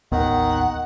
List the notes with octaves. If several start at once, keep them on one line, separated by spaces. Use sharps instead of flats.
A1 D#2 D#3 B3 F#5